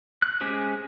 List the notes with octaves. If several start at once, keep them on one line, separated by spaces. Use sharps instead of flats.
F#6
G#3 C#4 G4 G#4 C5